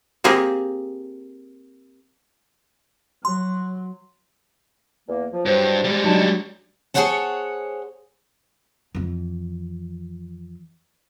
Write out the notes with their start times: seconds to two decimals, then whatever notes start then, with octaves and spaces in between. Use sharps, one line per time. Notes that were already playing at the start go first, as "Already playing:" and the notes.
0.24 A#3 C4 G4 G#4
3.25 F#3 C6
5.07 E2 A#3
5.33 F3
5.46 G2 E3 F#3 C5
5.84 G3 G#3
6.04 F#3 D4 D#4 A5
6.94 G#4 A4 C5 C#5 F#5 A5
8.95 F2 E3